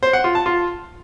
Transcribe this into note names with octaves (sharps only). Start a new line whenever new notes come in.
C5
F#5
F4
A5
F4